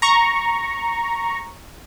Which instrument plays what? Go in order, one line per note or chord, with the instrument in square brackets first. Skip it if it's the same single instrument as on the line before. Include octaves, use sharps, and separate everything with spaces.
[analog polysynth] A#5 C#6